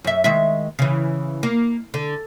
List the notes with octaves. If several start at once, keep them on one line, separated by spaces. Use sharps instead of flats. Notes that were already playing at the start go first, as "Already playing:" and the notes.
F#2 E5
D#3 G#3 E5
C#3 E3
A#3
D3